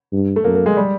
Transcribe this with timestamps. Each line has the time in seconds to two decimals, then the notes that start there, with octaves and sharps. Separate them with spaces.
0.13 G2
0.36 A3
0.44 F#2 A#3
0.55 A#3
0.66 G#3
0.77 G3